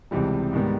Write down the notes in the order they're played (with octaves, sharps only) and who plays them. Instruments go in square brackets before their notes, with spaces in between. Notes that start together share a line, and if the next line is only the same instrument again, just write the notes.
[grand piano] C#2 C3 E3 G3
G#2 D#3 G3 B3